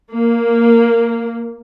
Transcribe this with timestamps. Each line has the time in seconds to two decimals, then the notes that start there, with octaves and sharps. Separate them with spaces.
0.11 A#3